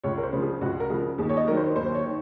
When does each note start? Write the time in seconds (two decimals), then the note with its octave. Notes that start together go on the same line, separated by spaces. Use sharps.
0.04 C#2 C#5
0.18 A#4
0.23 C5
0.33 C#3 F3
0.42 G#4
0.61 C#2 F#4
0.80 A#4
0.90 C#3 F3 G#4
1.18 D#2 G#4
1.29 C#5
1.37 D#5
1.47 D#3 F#3 A#4
1.57 C5
1.76 D#2 C5
1.95 C#5
2.05 D#3